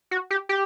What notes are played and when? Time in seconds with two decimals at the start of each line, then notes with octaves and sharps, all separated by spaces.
0.11 F#4
0.30 G4
0.49 G4